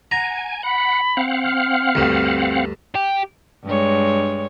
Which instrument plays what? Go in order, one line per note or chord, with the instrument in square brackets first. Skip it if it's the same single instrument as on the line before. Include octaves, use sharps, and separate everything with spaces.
[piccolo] F#5 [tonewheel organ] G#5 [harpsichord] A#5
[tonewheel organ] F#5 [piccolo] B5
[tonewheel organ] C4 F5 F#5
[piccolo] F6
[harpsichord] D2 G2
[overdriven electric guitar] G4
[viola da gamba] G2 G#3 C#5